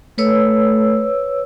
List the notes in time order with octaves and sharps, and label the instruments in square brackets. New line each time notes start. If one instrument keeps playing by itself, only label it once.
[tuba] A3 [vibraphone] B4 C#5 E6